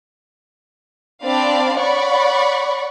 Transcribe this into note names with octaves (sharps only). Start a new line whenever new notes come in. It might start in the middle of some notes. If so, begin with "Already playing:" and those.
C4 D4 D5 F5 B5
C#5 D5 F#5 B5 C#6